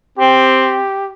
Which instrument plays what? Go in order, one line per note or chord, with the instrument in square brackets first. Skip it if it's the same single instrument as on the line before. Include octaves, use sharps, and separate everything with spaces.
[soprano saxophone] C4 [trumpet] G4